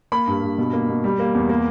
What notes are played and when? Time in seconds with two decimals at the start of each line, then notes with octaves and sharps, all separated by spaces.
0.12 A#3 B5
0.27 G2
0.42 G2
0.58 B2
0.73 A#3
0.89 B2
1.04 G3
1.19 A#3
1.35 E2
1.49 A#3